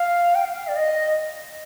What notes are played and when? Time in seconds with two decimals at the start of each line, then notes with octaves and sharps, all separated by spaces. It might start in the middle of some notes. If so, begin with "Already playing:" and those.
Already playing: F5
0.35 G5
0.45 F5
0.68 D5
0.76 D#5